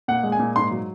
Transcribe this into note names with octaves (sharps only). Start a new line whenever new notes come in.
A#2 F#5
G#3
G#5
A#2
G#2 C6
F#3